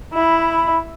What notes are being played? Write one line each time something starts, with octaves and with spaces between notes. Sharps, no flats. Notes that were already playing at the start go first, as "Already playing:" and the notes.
E4 B5